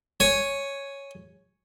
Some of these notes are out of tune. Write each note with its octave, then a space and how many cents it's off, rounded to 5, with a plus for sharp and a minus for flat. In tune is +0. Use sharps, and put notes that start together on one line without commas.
C#5 +0 G#5 +5